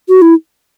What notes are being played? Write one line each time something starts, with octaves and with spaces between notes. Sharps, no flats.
F#4
E4